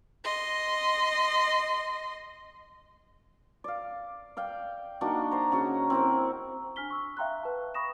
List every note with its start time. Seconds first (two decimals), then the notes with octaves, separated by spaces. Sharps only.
0.24 D#5 C6
3.64 D5 F5
4.37 D5 F5 G5
5.01 A#3 D4 D#4 F#4
5.31 C5 A#5
5.52 C#3 F#4
5.90 C4 E4 A#4
6.76 D4 G#5 F6 B6 G7
6.90 C#6 E6
7.17 E5 F5 G5 A#5 C6 F#6
7.43 B4 A5
7.75 B5 C#6 D#6 A#6 E7